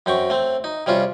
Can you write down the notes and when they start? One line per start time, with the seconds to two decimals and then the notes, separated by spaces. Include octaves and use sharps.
0.06 F#2 C4 G5 C#6
0.30 A3 C4
0.64 D#4
0.86 C3 G3 C#4 F4